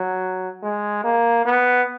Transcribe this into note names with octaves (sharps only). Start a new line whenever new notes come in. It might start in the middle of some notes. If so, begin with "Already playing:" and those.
Already playing: F#3
G#3
A#3
B3